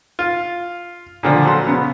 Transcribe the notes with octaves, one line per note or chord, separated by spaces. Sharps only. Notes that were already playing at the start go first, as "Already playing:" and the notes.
F4
A#2 D3 F3
A#1 F#3 A4 A#5 C6
C#3 B3